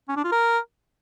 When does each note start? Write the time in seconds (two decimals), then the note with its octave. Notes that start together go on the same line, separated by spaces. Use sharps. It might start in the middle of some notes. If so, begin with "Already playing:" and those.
0.08 C#4
0.16 D4
0.24 F4
0.32 A#4